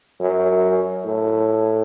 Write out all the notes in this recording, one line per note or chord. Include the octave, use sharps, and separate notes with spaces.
F#2
A2